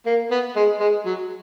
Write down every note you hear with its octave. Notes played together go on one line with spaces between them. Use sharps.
A#3
B3
G#3
G#3
F#3